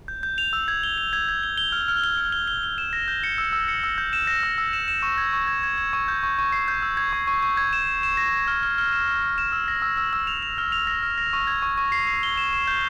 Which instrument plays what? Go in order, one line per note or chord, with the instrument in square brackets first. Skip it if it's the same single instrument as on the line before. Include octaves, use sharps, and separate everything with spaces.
[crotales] G6
G6
F7
E6
G#6
G7
G7
G#6
G#6
G7
G7
F6
F6
G7
F6
G7
G7
G7
E7
A#6
G6
C#7
E6
E6
C#7
E6
G6
E7
A#6
E6
E6
E7
E7
C#6
G#6
C#6
G#6
G#6
G#6
C#6
G6
C#6
C#6
C7
G6
E6
G#6
C#6
C#6
C#6
G#6
E7
E7
E7
A#6
E7
F6
F6
F6
E7
F6
F6
E7
E6
A#6
E6
E6
E6
F7
F7
F6
F7
A#6
F6
A#6
C#6
G#6
C#6
C#6
C7
C7
G7
E7
E7
G6